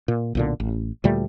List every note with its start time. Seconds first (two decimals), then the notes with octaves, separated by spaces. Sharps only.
0.08 A#2
0.35 B1 A#2 D3
0.60 A1
1.04 D2 A#2 G3 A3